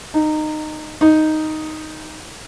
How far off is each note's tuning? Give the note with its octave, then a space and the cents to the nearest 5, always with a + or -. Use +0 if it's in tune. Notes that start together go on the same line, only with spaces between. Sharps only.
D#4 -20
D#4 +0